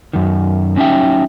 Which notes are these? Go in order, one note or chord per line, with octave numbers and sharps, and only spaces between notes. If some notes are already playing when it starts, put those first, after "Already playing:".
F#2 D#3
F#3 C#4 D#4 C#5 E5 G5